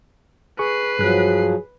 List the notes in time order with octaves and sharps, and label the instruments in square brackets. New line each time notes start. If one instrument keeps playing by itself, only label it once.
[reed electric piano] G#4 C#6 [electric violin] B4 C7
[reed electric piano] G2 F#6 [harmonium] F3 F#3 [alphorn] G#4